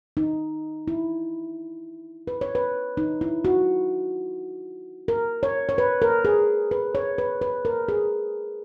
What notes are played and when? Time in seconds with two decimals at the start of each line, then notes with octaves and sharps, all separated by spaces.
0.17 D#4
0.88 E4
2.27 B4
2.41 C#5
2.55 B4
2.97 D#4
3.21 E4
3.45 F#4
5.08 A#4
5.43 C#5
5.69 C#5
5.78 B4
6.02 A#4
6.25 G#4
6.71 B4
6.95 C#5
7.18 B4
7.42 B4
7.65 A#4
7.88 G#4